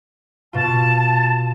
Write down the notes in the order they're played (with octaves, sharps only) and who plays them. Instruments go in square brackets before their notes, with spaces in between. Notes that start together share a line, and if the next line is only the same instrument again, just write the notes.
[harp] B2 F4 [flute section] A5